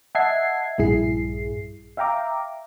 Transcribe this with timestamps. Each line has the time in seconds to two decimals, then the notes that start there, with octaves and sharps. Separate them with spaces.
0.15 D#5 E5 F#5 A5 G#6 C7
0.78 A#1 G2 G3 E4 G#4 C7
1.97 E5 F5 G5 A#5 D6